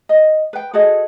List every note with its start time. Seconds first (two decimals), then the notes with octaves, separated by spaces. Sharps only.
0.09 D#5
0.53 B4 G5
0.73 F#4 G#4 A4 D#5